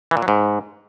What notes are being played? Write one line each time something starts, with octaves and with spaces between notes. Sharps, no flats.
E3
A#2
F#3
G#2